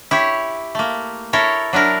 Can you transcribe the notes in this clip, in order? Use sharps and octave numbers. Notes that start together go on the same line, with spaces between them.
E4 G4 C#5
A3 A#3
E4 A4 A#4 C#5
F#3 D4 E4 A#4